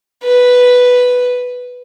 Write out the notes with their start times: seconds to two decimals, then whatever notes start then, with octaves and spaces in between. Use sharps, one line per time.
0.23 B4